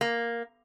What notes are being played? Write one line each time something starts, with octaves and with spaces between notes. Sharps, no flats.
A#3